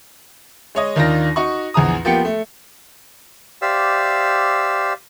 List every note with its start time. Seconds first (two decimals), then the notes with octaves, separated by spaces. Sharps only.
0.75 G#3 C#5 D#5
0.96 D#2 D#3 D4 F4 A#6
1.36 D#4 F#4 C#6
1.74 A#1 E2 G#4 A#5 D#6
2.05 F3 A#3 B3 G4 G5 C#7
2.25 A3
3.62 G4 C5 D5 E5 F5 E6